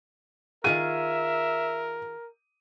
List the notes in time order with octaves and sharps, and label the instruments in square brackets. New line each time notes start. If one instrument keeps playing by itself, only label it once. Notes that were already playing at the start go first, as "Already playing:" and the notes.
[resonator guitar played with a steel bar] D#3 F4 G#4 [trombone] A#4 [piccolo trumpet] E5 [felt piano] D#7